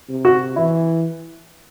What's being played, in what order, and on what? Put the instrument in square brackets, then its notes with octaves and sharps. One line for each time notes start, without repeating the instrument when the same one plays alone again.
[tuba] C3
[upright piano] F#4
[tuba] E3 [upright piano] E4